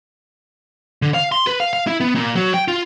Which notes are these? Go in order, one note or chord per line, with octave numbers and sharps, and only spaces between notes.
D3
F5
C6
B4
F5
F5
E4
B3
A#2
F#3
G5
F4